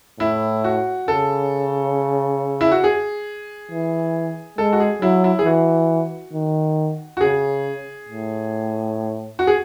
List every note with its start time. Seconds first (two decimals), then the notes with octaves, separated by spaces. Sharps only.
0.20 A2 E4
0.64 F#4
1.08 C#3 A4
2.61 E4
2.72 F#4
2.84 G#4
3.71 E3
4.58 G#3 A4
4.73 F#4
4.80 G#4
5.02 F#3 E4
5.24 E4
5.39 G#4
5.45 E3 F#4
6.33 D#3
7.17 F#4
7.21 C#3 G#4
8.08 A2
9.39 F#4
9.47 G#4